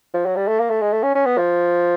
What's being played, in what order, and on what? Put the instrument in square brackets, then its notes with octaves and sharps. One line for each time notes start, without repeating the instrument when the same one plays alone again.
[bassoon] F3
F#3
G3
A3
A#3
A3
G#3
A3
C#4
C#4
B3
F3